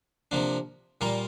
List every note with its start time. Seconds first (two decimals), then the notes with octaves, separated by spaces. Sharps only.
0.31 C3 F3 A#3 D4
1.01 A#2 G3 A#3 F4 A#4